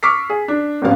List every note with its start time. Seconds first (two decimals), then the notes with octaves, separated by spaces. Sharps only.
0.03 C#6 D6 E6 F6 B6 C7
0.30 G#4
0.48 D4
0.82 G#1 D#2 C#3 F3 B3 F5